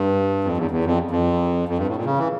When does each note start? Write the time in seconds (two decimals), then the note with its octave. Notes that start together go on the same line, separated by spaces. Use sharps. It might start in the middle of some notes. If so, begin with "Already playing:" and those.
Already playing: G2
0.44 F2
0.57 E2
0.71 E2
0.85 F2
1.11 F2
1.69 F2
1.78 G2
1.87 A2
1.96 A#2
2.05 C#3
2.19 E3